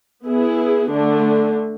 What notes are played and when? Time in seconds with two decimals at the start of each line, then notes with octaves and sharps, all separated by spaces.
0.25 B3 E4 G#4
0.91 D3 A3 D4